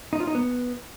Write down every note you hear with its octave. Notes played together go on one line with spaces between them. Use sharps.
D#4
F4
D#4
B3